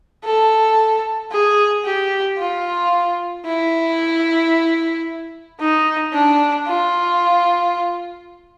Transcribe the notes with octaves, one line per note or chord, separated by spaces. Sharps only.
A4
G#4
G4
F4
E4
D#4
D4
F4